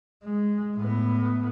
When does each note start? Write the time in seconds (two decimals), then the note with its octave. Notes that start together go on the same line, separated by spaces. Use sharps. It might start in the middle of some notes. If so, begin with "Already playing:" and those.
0.24 G#3
0.77 A2 B3